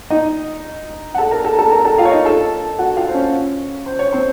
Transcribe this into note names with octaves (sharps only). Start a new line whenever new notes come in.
D#4 D#5
F#5
A4 A5
A#4 A#5
A4 A5
A4 A5
A#4 A#5
A4 A5
F4 F5
C#5
D#4 D#5
A4 A5
F#4 F#5
F4 F5
C5
C#4 C#5
C5
C#5
C4 C5